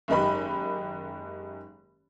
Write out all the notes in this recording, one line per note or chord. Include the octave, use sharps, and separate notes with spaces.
F#1 G#2 D#3 D#4 G4 B5